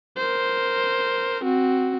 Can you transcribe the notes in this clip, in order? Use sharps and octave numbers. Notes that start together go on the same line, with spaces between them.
A#4 C5
C4 F#4